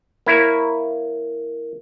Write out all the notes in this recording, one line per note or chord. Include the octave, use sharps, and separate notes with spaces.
A#3 E4 C#5